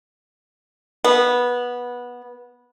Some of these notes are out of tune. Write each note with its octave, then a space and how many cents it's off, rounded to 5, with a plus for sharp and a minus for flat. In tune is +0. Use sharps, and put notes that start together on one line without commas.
B3 -15